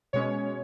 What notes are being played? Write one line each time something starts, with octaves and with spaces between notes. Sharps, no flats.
B2 G#3 C#4 C#5